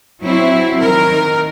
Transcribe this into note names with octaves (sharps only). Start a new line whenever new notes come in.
F#3 C4 E4
D#3 A#4